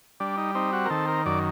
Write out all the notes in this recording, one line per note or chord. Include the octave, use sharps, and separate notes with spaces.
G3 D4
D#4
C4 D#4
F#4
A#4
D#3 A4
A#4
F#2 D5